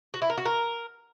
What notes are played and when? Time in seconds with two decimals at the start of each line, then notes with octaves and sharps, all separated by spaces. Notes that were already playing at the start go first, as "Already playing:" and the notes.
0.14 F#4
0.22 E4
0.30 A#4
0.38 F#4
0.45 A#4